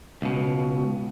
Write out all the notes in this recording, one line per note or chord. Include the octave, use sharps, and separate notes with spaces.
C#2 B2